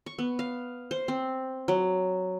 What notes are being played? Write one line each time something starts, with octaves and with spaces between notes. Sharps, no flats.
C#6
B3
F5
C5
C4
F#3